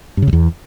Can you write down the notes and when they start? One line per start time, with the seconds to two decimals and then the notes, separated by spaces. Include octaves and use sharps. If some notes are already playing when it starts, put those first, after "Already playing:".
0.17 G2
0.22 C#3
0.28 G2
0.33 E2